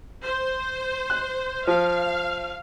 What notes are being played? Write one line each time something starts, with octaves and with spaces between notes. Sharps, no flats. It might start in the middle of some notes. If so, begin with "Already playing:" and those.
C5
F#6
F3 F5